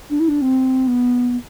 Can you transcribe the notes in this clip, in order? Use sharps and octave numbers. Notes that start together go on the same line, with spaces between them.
D4
E4
D4
C4
B3